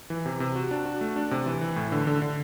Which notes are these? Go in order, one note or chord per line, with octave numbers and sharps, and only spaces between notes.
E3
C3
C3
F#4
D4
F#4
A3
D4
C3
E3
E3
A2
D3
D3
D3